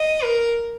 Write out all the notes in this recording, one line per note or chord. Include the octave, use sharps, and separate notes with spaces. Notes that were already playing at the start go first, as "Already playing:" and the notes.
Already playing: D#5
A#4